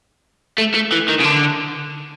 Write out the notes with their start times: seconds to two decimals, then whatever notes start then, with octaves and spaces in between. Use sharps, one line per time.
0.58 A3
0.74 A3
0.92 E3
1.09 D#3
1.20 C#3
1.25 D3